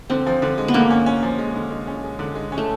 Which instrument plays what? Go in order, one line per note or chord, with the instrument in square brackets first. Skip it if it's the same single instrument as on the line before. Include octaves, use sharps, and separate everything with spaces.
[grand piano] D3 [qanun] C4
[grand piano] F3
D3
G#3
[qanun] B3
[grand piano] D3 [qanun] A#3
[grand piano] C#4
C#4
F3
G#3
D3
G#3
C#4
G#3
D3
G#3
C#4
[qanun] A3